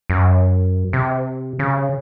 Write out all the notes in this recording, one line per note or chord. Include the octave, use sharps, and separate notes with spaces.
F#2
C3
C#3